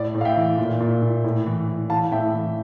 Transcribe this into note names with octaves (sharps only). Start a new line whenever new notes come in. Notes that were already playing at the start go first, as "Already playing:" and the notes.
Already playing: A2 D5
A2
F5
E5 G5
E3
A#2
A#2
A#2
A2
E3
E3
E3 F5 A5
A2 E5 G5
E3